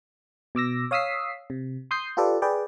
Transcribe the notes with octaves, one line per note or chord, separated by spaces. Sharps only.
B2 D6 E6 A#6
C#5 F5 D#6 E6 B6 C7
C3
C6 D#6 G6 C7
F4 G4 A4 B4 D5
G#4 B4 D5 G5